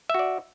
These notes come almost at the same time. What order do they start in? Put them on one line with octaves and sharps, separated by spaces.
E5 F#4 D5